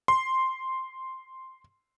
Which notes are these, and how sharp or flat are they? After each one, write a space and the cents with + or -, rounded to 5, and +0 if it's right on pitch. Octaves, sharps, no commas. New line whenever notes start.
C6 +0